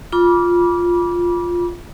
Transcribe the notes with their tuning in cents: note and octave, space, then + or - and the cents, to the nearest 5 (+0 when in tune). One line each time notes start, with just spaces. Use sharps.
F4 +0 B5 -30 D6 -15